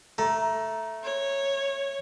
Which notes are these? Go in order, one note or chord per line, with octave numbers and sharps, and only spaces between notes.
A3 A#5
C#5